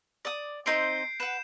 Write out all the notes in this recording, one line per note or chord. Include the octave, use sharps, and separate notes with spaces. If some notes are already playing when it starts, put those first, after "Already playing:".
D5 D#6
C4 D#4 C5 G6 C7 D7
B4 F#5 E7